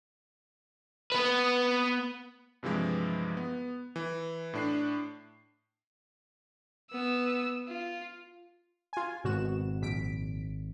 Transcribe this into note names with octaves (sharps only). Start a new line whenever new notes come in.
B3 B4
G2 C3 E3 F3 G#3
B3
E3
A2 D4 C7
B3 E6
F4
F4 G#5
G#1 B2 F#4 E7
A#1 B6 D7